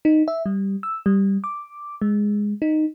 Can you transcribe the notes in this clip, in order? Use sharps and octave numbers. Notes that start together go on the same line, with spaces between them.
D#4
E5
G3
E6
G3
D6
G#3
D#4